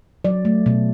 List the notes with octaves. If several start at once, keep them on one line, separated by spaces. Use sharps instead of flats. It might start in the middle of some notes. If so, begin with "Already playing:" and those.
F#3 D5
A3
B2